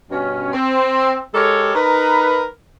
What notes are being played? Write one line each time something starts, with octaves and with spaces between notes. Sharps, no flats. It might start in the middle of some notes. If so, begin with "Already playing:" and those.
G2 B2 C#4
C4
G#3 G4 A4 A#4 C#5
D#4 A#4 B4